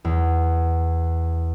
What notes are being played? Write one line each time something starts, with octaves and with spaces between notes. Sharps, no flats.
E2